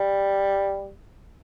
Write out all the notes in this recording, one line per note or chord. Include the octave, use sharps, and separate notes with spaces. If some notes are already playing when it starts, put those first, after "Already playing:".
Already playing: G3